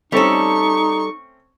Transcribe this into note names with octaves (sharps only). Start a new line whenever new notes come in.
G3 A3 C4 C#4 D#4 A4 C#6